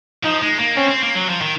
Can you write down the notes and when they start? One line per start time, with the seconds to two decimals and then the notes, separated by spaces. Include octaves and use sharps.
0.23 F3 D#4
0.41 G#3
0.59 A#3
0.76 C4 C#4
0.89 C4
1.02 A#3
1.15 F#3
1.29 F3
1.42 D#3